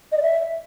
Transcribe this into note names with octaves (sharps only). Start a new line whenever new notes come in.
D#5
D5
E5